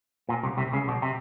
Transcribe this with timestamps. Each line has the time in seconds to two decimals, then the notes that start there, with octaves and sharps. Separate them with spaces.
0.29 A#2
0.43 C2 C3
0.57 C2 C3
0.72 C#2 C#3
0.88 B1 B2
1.02 C3